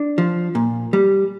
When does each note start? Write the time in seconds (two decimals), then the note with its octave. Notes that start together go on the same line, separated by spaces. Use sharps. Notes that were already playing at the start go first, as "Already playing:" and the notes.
Already playing: D4
0.18 F3
0.55 A#2
0.93 G3